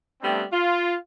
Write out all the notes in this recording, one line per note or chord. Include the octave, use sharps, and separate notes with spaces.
G3 A3 B3 C4 D4
F4